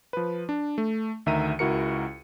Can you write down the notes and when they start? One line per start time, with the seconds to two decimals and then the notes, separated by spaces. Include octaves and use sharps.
0.13 F3 B4
0.49 D4
0.78 A3
1.26 D2 D#3 E5 A#5 D#7
1.59 C#2 E4 F#4 A#4 C#7